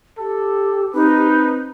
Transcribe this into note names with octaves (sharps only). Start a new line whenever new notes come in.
G4 A4
C4 D#4 B4